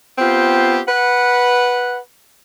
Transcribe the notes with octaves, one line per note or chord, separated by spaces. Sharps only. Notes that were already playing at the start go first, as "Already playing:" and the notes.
B3 C4 F4 G4
B4 F#5